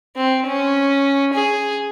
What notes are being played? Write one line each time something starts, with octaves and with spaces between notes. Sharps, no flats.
C4
C#4
G#4